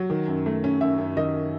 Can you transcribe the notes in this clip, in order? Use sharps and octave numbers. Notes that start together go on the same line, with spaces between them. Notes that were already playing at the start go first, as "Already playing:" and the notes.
Already playing: F#3
D#3
F#2
A3
C#4
F#2 E5
F#2
D#3 D#5